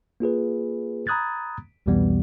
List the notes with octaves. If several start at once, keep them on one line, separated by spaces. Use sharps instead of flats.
A#3 F4 G#4 B4
A#5 B5 D#6 F#6 G#6 A6
C2 F2 B2 E3 G3 B3